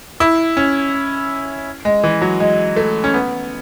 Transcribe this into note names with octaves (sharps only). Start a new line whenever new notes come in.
E4
C#4
G#3
E3
F#3
G#3
A3
C#4
B3